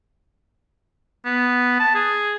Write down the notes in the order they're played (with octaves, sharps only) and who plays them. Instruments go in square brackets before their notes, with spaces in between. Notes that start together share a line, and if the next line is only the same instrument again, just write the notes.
[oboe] B3
A5
G#4